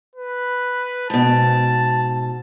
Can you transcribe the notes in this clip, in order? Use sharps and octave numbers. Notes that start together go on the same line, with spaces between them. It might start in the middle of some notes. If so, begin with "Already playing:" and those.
B4
G#2 B2 A5